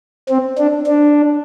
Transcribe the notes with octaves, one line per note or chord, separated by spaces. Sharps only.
C4
D4
D4